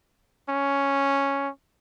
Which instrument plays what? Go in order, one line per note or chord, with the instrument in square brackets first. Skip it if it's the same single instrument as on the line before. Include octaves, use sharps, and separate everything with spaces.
[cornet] C#4